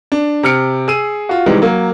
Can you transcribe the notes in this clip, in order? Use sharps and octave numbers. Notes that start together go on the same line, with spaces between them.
D4
C3 F6 C#7 D7
G#4 E6 D#7
F4 F#4
C3 D#3 E3 G3 G#3
F#3 A#3